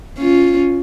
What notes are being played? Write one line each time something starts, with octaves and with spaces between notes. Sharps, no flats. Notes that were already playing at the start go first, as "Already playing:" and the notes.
C#4 F4